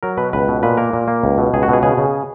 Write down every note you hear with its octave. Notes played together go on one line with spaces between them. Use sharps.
F#3 A#4
B2 B4
C#2 B4
B2
A#2 B4
A#3 A#4
A#2
A#3
C#2
B2
C#2 G#4
F#4
B2 G#4
C#3 G#4
C#3